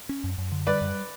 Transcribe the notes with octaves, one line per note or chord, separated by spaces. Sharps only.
C#4
F#2
F#2
D3
G3 B4 D5
F#2